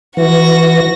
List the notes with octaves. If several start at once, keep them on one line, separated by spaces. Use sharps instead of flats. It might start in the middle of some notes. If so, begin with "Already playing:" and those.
E3 F#4 A#6